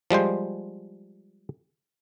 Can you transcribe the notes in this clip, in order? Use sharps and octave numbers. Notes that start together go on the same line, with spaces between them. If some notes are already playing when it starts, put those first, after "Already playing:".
F3 G3 G#3 C5